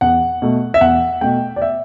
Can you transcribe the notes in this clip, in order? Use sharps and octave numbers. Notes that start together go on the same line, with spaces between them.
E2 F#5
B2 A3
E5
E2 F#5
B2 A3 G5
D5
E5